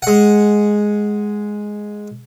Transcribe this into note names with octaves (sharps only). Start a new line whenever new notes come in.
G#3 F#5